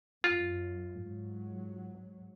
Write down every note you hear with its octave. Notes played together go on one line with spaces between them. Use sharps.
F#2 F4
G#2 F#3